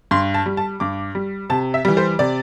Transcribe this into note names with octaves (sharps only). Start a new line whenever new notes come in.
G2 C6
A5
G3
A5
G2 D6
G3
C3 A5
E5
E3 G3
C5
C3 D5